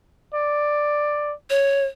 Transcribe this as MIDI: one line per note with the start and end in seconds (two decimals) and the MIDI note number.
0.34 1.33 74
1.50 1.85 73